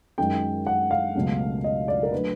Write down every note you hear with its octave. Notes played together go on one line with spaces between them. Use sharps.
F#2 D#3 G#3 G5
F#5
F5
C#2 B2 F#3 A3
D#5
D5
A#4
D3 F#3 A3 B4